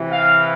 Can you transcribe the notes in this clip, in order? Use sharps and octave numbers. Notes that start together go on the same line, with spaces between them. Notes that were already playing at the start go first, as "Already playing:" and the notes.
Already playing: C3 E3
F5